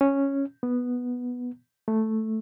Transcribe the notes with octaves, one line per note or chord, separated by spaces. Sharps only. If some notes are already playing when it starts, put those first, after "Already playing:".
C#4
B3
A3